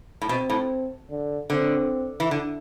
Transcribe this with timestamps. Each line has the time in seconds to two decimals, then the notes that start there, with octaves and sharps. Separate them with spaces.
0.22 A2
0.29 B2 C4
0.50 A2
1.10 D3
1.50 D3 C4
2.20 E3
2.31 D3